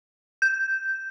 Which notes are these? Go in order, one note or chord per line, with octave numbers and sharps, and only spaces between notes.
G6